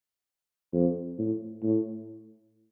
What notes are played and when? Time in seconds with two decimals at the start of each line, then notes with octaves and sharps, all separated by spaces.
0.73 F2
1.18 A2
1.63 A2